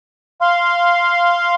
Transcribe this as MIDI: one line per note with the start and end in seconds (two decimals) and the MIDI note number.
0.41 1.55 77
0.41 1.55 84